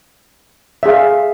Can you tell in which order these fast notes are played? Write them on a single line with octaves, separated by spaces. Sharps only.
E5 G#4 F5